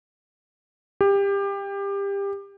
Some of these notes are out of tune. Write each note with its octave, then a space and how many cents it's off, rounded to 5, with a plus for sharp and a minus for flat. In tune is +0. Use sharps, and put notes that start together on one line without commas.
G4 +25